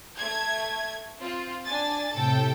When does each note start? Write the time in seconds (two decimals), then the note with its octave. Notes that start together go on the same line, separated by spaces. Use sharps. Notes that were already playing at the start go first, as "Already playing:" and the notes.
0.18 A3 G#6
1.20 C4 F4
1.66 D4 G#5 A6
2.13 A2 C3 A4 G5